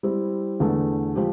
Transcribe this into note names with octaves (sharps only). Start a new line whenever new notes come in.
G3 C4 E4
E2 D3 A3
F3 C4 G4